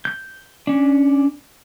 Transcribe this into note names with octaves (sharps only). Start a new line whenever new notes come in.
G6
C#4 D4